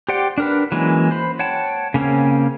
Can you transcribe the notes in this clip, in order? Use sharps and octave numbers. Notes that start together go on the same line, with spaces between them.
G4 C5 D5 F#5 G5
D4 A#4 B4
E3 F#3 G#3 A#3 C#4
C5 B5
C#5 F#5 G5 A5
C#3 A#3 C4 C#4